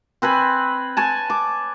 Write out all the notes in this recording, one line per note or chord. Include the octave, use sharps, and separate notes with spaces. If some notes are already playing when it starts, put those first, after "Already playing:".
C4 B4 G#5 B5
C#5 G#5 A5
D6